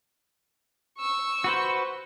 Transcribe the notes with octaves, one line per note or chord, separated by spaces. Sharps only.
C#6 E6
F#4 B4 C5